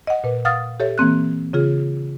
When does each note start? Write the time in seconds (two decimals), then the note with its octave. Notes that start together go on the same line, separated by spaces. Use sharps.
0.07 D#5 F#5
0.24 A#2 B4
0.45 F5 F#5 D#6 F6 A6
0.80 G4 A4 C#5 E5
0.98 E3 A#3 C4 F#6
1.53 C#3 F4 G#4